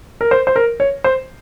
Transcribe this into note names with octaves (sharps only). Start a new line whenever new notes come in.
A#4
C5
C5
A#4
C#5
C5